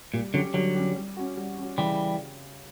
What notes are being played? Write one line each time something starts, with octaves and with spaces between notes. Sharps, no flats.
A#2 G3
D3 F#3 C#4 G4
D3 F#3 G3
C#4 G4
G3
C#4 F#4
G3
C#4 F#4
C#3 E3 G3